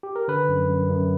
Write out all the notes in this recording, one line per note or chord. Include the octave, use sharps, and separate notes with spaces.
G4
A#4
D3 B4
F#2
F#2
F#2